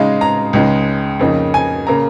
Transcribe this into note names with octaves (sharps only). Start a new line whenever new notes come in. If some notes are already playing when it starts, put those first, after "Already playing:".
Already playing: C#3 G#3 D#4 F5
A#5
C#2 C#3 G#3 D#4
F2 C#3 A#3 D#4
G#5
C#3 A#3 A#5